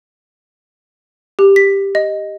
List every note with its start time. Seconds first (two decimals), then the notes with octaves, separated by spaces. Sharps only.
1.39 G4
1.56 B6
1.95 D#5